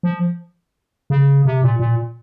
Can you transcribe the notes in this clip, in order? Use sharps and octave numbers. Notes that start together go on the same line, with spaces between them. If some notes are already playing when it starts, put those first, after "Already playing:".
F3
C#3
C3
A#2
A#2